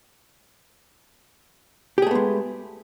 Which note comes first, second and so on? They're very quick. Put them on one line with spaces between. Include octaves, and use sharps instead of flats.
G4 G#4 A3 B3 G#3